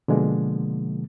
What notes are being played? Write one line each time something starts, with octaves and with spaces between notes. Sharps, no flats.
B2 D3 F3 G#3 A#3